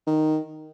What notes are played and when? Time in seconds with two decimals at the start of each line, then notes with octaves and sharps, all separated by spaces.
0.07 D#3